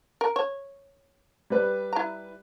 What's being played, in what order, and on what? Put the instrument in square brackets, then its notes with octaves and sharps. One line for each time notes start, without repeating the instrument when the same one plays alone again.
[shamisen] A#4
C#5
[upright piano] G3 B4
[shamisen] E4 A#5